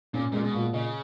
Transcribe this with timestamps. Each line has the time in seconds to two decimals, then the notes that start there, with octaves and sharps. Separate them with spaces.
0.14 A#2 C#4
0.32 A#2 G#3
0.44 B2
0.54 A#2
0.73 C#3 D#5